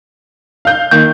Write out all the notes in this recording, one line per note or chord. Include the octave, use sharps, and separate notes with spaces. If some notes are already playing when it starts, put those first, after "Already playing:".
F5 G6
D#3 A#3 G6